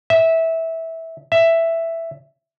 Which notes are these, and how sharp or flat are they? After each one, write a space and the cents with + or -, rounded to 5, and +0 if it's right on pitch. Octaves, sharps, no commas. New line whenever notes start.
E5 -15
E5 +5